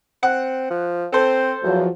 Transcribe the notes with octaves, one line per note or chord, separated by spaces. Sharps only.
C4 F#5
F3
C4 A4 C5
E2 F3 F#3